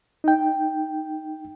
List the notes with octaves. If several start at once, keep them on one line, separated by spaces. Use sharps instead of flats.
D#4 G5